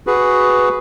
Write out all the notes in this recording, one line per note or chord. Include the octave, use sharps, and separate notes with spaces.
F#4 G#4 B4